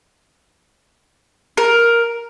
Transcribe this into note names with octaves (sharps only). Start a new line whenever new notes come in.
A#4